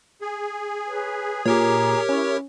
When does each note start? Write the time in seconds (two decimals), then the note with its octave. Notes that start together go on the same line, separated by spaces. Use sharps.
0.21 G#4
0.88 B4 C#5 A#5
1.46 A#2 G4 A#4 C#5 A#5 D6
2.09 C#4 E4 C#6